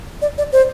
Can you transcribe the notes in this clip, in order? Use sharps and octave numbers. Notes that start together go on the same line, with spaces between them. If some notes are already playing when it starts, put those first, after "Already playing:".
D5
D5
C5